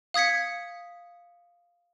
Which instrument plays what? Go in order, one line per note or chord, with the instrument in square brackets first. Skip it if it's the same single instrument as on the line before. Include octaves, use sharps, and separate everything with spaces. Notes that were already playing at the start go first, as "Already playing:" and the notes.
[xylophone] F5 D#6 G#6 B6 C#7